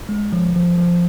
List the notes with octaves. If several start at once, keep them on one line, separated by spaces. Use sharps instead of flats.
G#3
F3
F3
F3